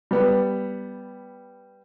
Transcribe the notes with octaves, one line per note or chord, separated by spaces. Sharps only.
G3 B3